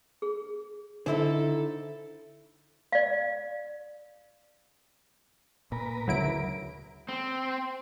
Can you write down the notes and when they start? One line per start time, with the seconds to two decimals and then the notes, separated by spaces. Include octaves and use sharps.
0.22 G#4
1.06 D3 D#4 E4 A4 C5
2.92 D5 F5
5.72 A#2 A#4 B4
6.08 D2 C#3 F#3 E4 D7
7.09 C4